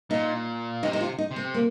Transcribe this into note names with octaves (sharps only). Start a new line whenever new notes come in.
A#2 D#4
C3 D#4
D#4
F4
D#4
C3
C4
A#3